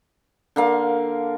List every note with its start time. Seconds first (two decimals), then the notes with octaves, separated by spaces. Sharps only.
0.56 D3 A#3 F5